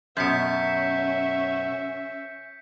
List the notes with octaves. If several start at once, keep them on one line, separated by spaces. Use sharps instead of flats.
F#2 B2 C#4 E5 G6 B6 C#7